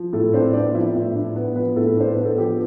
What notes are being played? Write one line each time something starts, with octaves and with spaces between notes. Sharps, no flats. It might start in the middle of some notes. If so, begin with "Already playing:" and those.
Already playing: F3
A2 A4
C4 D4 C5
B3 D4 D5
F3 E4 E5
A2
D4
B3
F3 B3 B4
A2 A4
D4 C5
B4
B3
A4
F3 G4